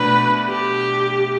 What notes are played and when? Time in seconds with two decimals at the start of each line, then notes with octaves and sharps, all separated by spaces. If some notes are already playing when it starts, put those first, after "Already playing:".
Already playing: B2 A3 D4 B4
0.48 G4